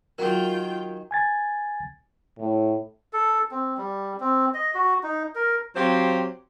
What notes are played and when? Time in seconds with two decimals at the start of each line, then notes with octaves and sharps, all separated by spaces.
0.18 D#3 F#3 F4 G#4 A#4 G5
1.11 G#5 G#6 A6
2.38 A2
3.13 A4
3.51 C4
3.77 G3
4.20 C4
4.54 D#5
4.75 F#4
5.03 D#4
5.35 A#4
5.76 F#3 C4 G4 C5 F5